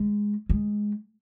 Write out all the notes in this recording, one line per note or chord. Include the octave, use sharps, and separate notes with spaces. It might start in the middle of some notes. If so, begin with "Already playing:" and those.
Already playing: G#3
G#3